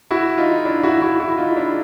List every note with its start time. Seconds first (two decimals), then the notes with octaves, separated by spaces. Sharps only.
0.11 E4 F#4
0.38 D#4 F4
0.65 D4 E4
0.83 E4 F#4
1.01 E4 F#4
1.20 E4 F#4
1.38 D#4 F4
1.56 D4 E4